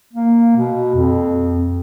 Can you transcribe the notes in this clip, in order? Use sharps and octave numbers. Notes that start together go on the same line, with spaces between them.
A#3
B2
F2